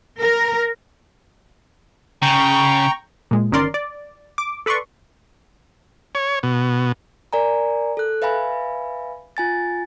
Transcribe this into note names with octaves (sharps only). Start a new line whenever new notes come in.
A#4
C#3 G5 A#5 C#6
A#2 G#3
G1 D#3 C#4 A#4 D5 C6
D5
D6
A4 B4 D5 C6 C#6
C#5
B2
A#4 D5 G#5 A#5
A4 F#6
B4 E5 F5 G#5 B5
F4 G#5 A6